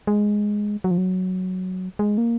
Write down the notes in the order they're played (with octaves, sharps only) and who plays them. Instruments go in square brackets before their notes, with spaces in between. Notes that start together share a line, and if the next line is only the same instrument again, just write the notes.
[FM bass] G#3
F#3
F3
F#3
G#3
A#3